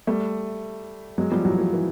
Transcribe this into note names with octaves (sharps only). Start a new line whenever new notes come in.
G3 A3
F#3 G#3
F3 G3
E3 F#3
F3
E3